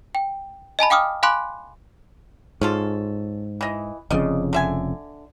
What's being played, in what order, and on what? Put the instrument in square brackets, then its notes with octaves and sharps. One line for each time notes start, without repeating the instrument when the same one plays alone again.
[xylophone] G5
D#5 G#5 A5 B5
F5 G5 D6 D#6 F6
F5 G#5 B5 C6 D6 F#6
[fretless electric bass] G#2 [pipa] C#4 F4 A4
[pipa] E3 D#5
[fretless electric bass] F1 F2 C#3 [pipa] D5 D#5
[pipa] D3 E5 G#5